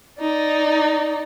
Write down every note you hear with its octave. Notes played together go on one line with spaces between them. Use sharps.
D#4 D5